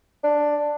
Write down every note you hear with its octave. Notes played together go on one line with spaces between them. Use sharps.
D4